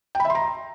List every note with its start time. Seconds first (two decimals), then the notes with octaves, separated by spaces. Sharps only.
0.15 G5
0.20 B5
0.25 E5
0.30 C6
0.35 A#5